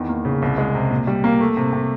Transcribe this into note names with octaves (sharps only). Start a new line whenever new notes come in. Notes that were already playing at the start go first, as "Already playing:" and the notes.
Already playing: E2 D#3
A#3
C#3
C2
G#3
C3
A#2
G3
A#3
A3
C3
C3